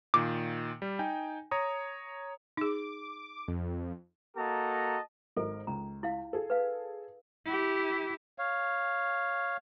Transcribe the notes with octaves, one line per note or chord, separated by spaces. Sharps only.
A#2 D#3 D6
G3
D#4 G5 G#5
C#5 A#5 D#6
D#4 G#4 D6
F2
A#3 F#4 A4 D#5 A5 A#5
G#1 A4 A#4 D#5
C#2 A#5
E4 F5
G#4 A4
B4 F5
E4 G4
C#5 F5